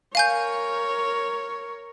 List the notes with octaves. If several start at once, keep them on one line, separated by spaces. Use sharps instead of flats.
A#4 C#5 F5 G#5 G6